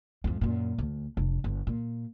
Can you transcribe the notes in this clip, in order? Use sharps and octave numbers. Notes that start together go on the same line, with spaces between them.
F2 G#2
F#2 A#2
D2
F1 D4
G1
A#2